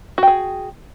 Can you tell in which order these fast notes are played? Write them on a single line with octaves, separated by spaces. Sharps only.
F#4 G5 G#4